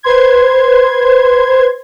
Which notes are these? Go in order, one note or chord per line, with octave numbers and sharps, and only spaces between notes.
B4 C5 C6 G#6